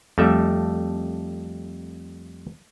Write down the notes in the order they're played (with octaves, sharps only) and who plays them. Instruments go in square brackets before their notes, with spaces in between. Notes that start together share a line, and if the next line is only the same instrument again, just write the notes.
[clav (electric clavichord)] F2 G3 A3 A4 E5